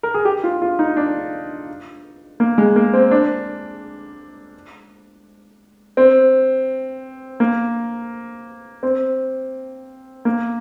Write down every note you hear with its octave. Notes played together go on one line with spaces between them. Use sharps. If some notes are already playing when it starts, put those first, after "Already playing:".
A#4
G#4
G4
F4
F4
D#4
D4
A#3
G#3
A#3
C4
D4
C4
A#3
C4
A#3